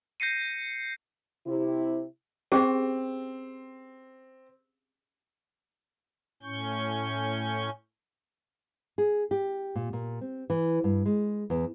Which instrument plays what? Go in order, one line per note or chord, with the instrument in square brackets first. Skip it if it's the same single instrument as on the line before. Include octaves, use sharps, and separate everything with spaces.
[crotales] G6 A#6 C7 C#7 D#7
[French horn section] C3 E4
[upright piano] C4 [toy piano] C#4 G4 G#4
[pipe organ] A2 C#4 C#6 G6
[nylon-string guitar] G#4
G4
A#2
A#2
C4
E3
G2
G#3
E2